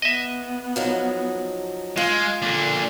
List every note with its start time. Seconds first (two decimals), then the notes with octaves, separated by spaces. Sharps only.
0.02 B3 D#5 E5
0.76 F3 F#3 D#4
1.97 G#3 F4
2.42 A#2 D3 D4